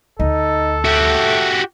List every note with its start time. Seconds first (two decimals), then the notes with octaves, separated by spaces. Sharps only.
0.20 D2 D#4 A4
0.85 A3 F#4 G4